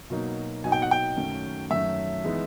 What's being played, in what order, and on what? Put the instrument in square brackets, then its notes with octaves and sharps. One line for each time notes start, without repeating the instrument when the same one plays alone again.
[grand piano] B2 F#3 A#3 D#4
[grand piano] B2 F#3 A#3 D#4 [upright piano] G#5
[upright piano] G5
F#5
G5
[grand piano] F#2 D#3 F#3 A3 C#4
[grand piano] F#2 D#3 F#3 A3 C#4 [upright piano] E5
[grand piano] E3 G#3 B3 D#4